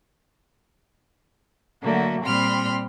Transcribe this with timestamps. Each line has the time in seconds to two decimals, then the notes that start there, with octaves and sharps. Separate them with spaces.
1.83 D3 F#3 A3 A#3 F#4
2.22 A#2 G3 C4 B5 C6 F6